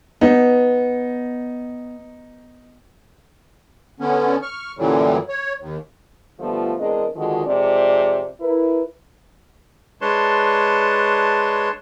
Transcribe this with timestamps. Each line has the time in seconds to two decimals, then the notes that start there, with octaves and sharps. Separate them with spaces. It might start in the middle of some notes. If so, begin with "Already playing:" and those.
0.21 B3 D#4
4.00 D3 B3 C#4
4.42 C#6 F6
4.78 F#2 A#2 D3 E3 F#3 G3
5.29 C#5
5.60 D#2
6.40 D3 F3 G3 A3 B3 F4
6.80 E2 G#3 C4 D4 A#4 D#5
7.16 D3 D#3 F3 G#3 F#4
7.46 F2 C3 G#3 D5
8.40 E4 A#4 B4
10.01 G#3 D4 B4 C#5 A5 C6